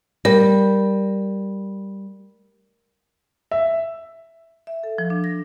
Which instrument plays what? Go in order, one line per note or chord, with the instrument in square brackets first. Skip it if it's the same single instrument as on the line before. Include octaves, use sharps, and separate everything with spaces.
[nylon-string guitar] G3 [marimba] A#4
[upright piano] E5
[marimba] E5
A4
F3
D4
A#6